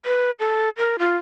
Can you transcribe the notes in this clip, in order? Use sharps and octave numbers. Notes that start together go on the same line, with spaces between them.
B4
A4
A#4
F4